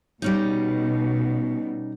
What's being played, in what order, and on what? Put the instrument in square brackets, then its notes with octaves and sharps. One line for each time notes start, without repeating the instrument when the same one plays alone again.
[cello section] B2 [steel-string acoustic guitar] G3 C#4 D#4